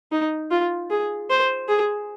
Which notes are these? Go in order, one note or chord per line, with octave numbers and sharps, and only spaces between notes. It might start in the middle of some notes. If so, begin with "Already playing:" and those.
D#4
F4
G#4
C5
G#4